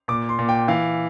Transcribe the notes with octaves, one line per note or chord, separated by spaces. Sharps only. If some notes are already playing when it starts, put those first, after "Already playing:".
A#2 D6
C6
A#2
G5
E3 F5